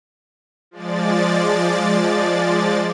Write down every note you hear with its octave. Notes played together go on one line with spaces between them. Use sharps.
F3 G#3 D5 A6